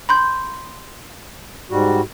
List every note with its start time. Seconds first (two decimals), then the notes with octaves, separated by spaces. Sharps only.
0.09 B5 C6 G6
1.70 G#2 G3 F#4